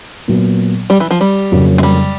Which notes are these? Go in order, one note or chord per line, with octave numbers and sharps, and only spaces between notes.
A#2 F#3 B3
G3
E3
F3
G3
F2 C#3 F#3 A#3
G#3
G3